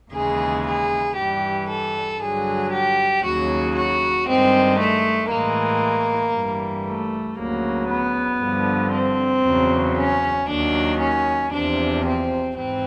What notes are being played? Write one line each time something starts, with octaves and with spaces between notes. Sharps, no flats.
D#2 C#3 E3 G#3 G#4
G#4
G2 E3 G3 G4
A4
G2 D3 F#3 G#4
G4
D#2 C#3 F#3 F#4
F#4
G2 D#3 G#3 C4
A3
A2 E3 G#3 A#3
G2 E3 G3
A3
D2 C#3 F#3 A#3
B3
G2 D3 F3
C4
E2 C#3 F#3
C#4
D#2 D#3 F#3 D4
C#4
E2 C3 F3 D4
C4
G#2 E3 C4